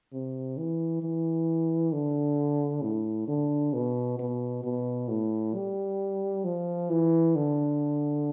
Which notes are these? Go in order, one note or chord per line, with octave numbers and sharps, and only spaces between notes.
C3
E3
E3
D3
A2
D3
B2
B2
B2
A2
G3
F3
E3
D3